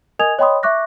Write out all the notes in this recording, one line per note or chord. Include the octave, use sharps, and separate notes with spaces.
A#4 D#5 G#5 D#6 G#6 F7
C#5 D#5 G5 B5 C6 D#6
E5 C#6 D6 F#6 A#6